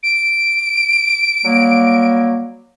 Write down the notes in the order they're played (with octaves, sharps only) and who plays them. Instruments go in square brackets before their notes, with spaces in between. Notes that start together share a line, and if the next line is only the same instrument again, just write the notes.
[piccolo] D7
[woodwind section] F#3 G3 A#3